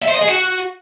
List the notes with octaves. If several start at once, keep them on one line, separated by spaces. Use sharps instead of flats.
E5
C5
D#5
G#4
F#4